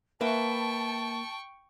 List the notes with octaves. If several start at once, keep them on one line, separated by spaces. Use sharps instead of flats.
A#3 B4 E5 G5 A5 C#6